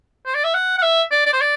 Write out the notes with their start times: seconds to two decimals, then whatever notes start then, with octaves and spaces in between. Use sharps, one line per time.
0.26 C5
0.35 D5
0.44 E5
0.54 F#5
0.78 F#5
0.83 E5
1.11 D5
1.26 D5
1.33 C5
1.41 D5